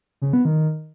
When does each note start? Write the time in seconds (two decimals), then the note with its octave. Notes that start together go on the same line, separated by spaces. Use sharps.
0.22 C#3
0.33 B3
0.45 D#3